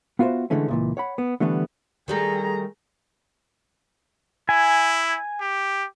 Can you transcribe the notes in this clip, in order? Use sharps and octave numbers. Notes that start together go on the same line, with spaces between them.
B3 F4 F#4 A4 C5 E5
D3 E3 G#3 A3 C#4
C#2 A#2 E3
C#5 F#5 B5
B3
D3 E3 G3 A3 B3
D#3 G3 A3 G#4 A#5
E4 G#5
G4